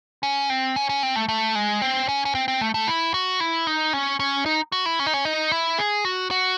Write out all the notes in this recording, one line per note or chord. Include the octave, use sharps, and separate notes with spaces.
C#4
C4
C#4
C#4
C4
A3
A3
G#3
C4
C#4
C#4
C4
C4
A3
A3
E4
F#4
E4
D#4
C#4
C#4
D#4
F#4
E4
C#4
D#4
C#4
D#4
E4
G#4
F#4
F#4